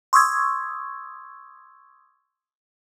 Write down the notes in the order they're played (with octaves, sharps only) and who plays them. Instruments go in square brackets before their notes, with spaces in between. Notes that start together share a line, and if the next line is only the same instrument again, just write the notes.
[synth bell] C6 C#6 D#6 E6 G#6